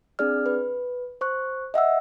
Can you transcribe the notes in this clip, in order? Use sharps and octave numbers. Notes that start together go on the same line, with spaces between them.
C4 D4 G#4 D5 F6
B4
C5 C#6 F#6
D#5 E5 F#5 E6